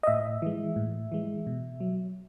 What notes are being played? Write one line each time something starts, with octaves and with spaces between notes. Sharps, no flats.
D#5
A2 E5
E3 G#3
A2
E3 G#3
B2
F#3